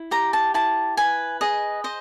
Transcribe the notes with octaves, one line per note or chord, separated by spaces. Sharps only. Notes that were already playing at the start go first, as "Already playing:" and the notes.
Already playing: E4
G4 A#5
A5
E4 A5
B4 G#5
G#4 D#5
C5 D#5